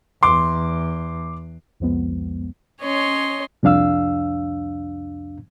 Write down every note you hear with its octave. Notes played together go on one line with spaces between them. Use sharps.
E2 C6 D6
C2 F2 F3 G#3 B3
C#4 C#5 D#5 C6
C2 F2 D4 F5 E6